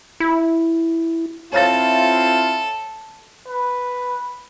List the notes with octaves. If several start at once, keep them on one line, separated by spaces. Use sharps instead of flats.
E4
C4 E4 F4 A4 C#5 F5 A6
B4